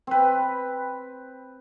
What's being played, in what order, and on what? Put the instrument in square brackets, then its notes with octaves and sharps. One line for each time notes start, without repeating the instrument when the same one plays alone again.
[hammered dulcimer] C4 B4